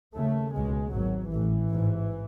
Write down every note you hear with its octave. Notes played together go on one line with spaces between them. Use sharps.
D#2 C#3 A3
C#2 B2 G#3
G#1 G#2 F#3
A1 A2 E3
A1 G#2